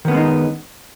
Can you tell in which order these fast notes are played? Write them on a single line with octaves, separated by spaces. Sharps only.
D#3 B3 C#4 G#3 D#4